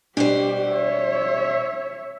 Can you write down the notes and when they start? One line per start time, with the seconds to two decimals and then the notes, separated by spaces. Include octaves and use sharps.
0.17 B2 G3 D4 G4 C5
0.71 C#5 E5